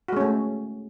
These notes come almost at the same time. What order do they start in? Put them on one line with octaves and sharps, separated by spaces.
F#4 G#3 C#4 A3